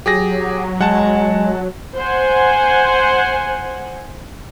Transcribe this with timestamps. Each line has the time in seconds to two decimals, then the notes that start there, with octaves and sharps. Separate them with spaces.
0.06 F#3 G4 G#4 A#6
0.81 G#3 F#5 A5
1.96 C5 F#5 G#5